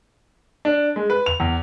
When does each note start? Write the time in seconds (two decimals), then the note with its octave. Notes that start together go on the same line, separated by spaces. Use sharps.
0.65 D4
0.96 G#3
1.10 B4
1.26 F7
1.40 E2